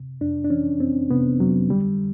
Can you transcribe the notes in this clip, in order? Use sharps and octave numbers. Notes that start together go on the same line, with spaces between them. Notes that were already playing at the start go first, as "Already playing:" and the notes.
Already playing: C3
F2 D4
D4
E3 C#4
F2 C4
C3 B3
F2 F#3
D3 G3